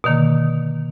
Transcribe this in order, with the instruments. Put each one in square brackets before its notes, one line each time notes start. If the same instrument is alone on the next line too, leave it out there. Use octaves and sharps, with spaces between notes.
[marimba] B2 D3 D#3 A#3